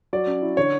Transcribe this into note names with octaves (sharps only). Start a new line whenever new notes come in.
F#3 D5
C#4
E4
D3 C#5